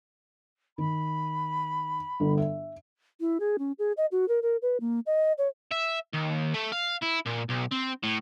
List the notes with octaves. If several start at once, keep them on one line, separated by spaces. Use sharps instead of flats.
D#3 B5
G1
E5
E4
G#4
C#4
G#4
D#5
F#4
A#4
A#4
B4
A#3
D#5
C#5
E5
D#2
A3
F5
E4
A#2
B1
C4
A2